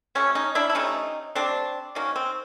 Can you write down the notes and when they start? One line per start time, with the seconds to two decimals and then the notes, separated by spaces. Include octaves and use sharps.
0.15 C3 F3 A3 C#4
0.35 C#4 D#4
0.55 D4 E4
0.70 E4
0.75 C3 F3 A3 C#4 D#4
1.35 C3 F3 A3 C4 D4
1.95 D#3 F#3 A#3 C#4
2.16 C4